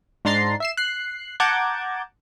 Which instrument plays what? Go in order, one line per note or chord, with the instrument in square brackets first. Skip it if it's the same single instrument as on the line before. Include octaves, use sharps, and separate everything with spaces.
[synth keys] G#2 D4 A#5 C6 A6 C7
E5 C7 E7
F#6 C7
F#5 A5 A#5 D6 G6 G#6